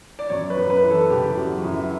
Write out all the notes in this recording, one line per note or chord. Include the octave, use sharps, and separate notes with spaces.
D5
F#2 C#5
B4
F#2
B4
E3
A4
C#3 G4
G4
F#2 F#4
F#2 E4